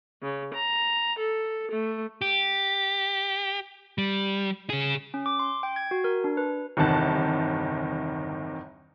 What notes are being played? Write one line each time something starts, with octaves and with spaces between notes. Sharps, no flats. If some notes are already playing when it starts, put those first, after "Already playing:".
C#3
A#5
A4
A3
G4
G3
C#3 G#4
C#4
D6
C6
G5
G#6
F#4
A#4
D4
B4
G1 E2 C3 D#3 A5 F#6